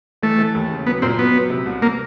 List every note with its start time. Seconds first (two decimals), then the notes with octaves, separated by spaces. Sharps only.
0.22 E3 A3
0.39 E3
0.55 D#2
0.71 C#3
0.87 F#3 B3
1.02 A#2 C4
1.18 F#3 B3
1.35 F#3
1.50 C3
1.66 C2
1.82 A#3